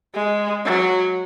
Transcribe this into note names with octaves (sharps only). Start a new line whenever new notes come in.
G#3
F#3